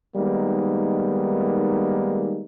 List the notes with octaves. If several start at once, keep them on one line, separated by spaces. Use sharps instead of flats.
D#3 G3 G#3 A#3 B3 D#4